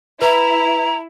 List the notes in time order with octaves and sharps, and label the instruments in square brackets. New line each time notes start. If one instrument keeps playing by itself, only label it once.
[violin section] E4 [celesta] B4 [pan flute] A#5